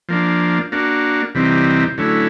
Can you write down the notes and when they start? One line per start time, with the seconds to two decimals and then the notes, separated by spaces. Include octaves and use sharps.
0.09 F3 A#3 D4
0.72 A#3 D4 F#4
1.35 C3 E3 G3 C4 D#4
1.98 D3 F#3 A3 C#4 E4